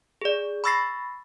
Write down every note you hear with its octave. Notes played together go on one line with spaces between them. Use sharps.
G#4 D5
B5 C#6 E6 A6 A#6 C7